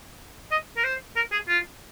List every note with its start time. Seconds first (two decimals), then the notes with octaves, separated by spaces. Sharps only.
0.52 D#5
0.77 A#4
0.84 C5
1.16 A#4
1.32 G#4
1.48 F4